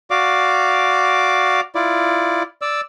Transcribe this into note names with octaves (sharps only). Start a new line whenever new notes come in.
F#4 D5 F5 D6
E4 F4 D5
D5 E6